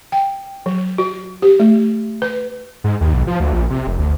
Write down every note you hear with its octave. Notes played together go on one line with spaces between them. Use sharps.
G5
F#3
F#4
G4
A3
B4
G#2
D#2
B1
F3
D2
A#1
C3
F1
D2